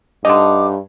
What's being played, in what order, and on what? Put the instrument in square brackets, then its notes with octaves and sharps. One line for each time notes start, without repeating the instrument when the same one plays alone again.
[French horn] G2 [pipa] D3 A3 D#4 [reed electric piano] D#5 [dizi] D6